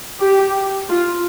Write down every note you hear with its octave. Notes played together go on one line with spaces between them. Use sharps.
G4
F4